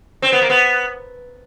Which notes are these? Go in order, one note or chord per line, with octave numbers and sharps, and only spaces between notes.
C4
B3
A#3
B3